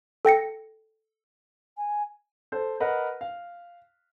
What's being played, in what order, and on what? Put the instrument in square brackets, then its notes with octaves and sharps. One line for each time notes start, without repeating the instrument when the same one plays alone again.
[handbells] A4 G5 A#6 C#7
[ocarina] G#5
[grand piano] A4 C5
A#4 B4 D#5 F#5
F5